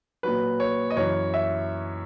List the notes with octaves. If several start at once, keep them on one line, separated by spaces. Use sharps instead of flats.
A#2 F#3 B4
C#5
D#5
F#2 E3 C#5
E5